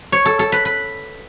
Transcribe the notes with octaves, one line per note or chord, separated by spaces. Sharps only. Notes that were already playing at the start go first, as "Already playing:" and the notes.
C#5
A4
A4
B4
B4